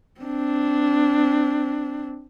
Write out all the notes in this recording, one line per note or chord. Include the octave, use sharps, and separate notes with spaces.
C4 D4